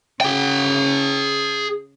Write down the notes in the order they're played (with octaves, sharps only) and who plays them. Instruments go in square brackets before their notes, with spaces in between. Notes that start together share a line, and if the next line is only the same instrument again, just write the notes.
[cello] C#3 [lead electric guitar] G#4 G5